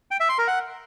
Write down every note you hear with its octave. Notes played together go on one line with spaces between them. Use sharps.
G5
E5
C6
A#4
F#5